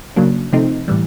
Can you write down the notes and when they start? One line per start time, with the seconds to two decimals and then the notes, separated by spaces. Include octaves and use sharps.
0.16 C#3 F#3 A#3 D4
0.53 C3 F3 A3 C4 D#4
0.88 A2 E3 G3